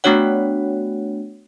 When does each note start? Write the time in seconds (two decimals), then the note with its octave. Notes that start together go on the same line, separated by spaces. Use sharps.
0.04 A3 B3 D4 F#4 C#5 F#5